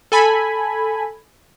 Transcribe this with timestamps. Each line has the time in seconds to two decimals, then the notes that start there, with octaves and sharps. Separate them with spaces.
0.12 A4 G#5 B5